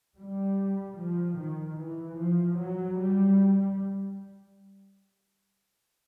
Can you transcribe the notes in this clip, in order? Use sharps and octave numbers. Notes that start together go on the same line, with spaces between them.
G3
F3
D#3
E3
F3
F#3
G3